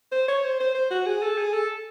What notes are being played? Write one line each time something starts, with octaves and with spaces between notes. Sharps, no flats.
C5
C#5
C5
C5
C5
F#4
G#4
A4
G#4
A4